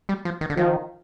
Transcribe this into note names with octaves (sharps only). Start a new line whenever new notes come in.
G3
F3
D#3
D3
D#3 F3